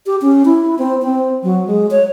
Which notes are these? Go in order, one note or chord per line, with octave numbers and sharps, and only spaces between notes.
G4
C#4
E4
C4
C4
F#3
G#3
C#5